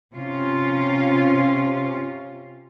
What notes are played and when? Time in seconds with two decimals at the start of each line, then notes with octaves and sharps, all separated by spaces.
0.12 C3 C#4 F4